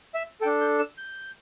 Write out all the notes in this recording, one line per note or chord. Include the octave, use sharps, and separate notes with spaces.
E5
D4 A4 G5
G6
E6
G6